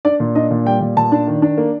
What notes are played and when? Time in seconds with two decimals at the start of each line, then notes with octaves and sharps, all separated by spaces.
0.05 D4 D5
0.20 A#2
0.35 D4 D#5
0.51 A#2
0.65 G3 G5
0.81 A#2
0.97 A#2 A5
1.12 D4
1.27 D#3
1.42 D4
1.57 A#3